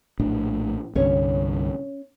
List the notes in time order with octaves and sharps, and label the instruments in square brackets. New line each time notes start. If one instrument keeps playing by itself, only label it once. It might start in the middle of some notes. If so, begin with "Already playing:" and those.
[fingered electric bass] A#1 A2 D4
[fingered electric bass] C2 G2 D3 [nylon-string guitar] C#4 C#5